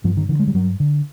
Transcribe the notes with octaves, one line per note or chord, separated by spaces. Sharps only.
G2 F3
D#3
D3 E3
G#3
G3
G2 F#3
D3